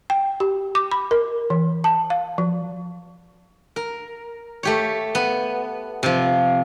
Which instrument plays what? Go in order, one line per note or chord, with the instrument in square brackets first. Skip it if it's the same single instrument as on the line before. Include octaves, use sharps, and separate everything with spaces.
[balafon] G5
G4
D6
B5
A#4
E3
A5
F5
F3
[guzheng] A#4
A3 G4 C#5
B3
C3 F3